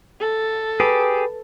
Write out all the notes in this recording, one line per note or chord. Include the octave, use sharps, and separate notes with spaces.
A4
G4 G#4 B4